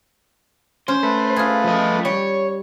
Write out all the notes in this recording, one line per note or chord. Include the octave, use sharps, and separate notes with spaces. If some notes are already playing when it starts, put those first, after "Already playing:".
C#4 C5
A3 B4
F4 G#4
F3 D#5
G3 C#5